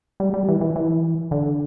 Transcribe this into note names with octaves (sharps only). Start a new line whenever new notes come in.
G3
G3
E3
E3
E3
D3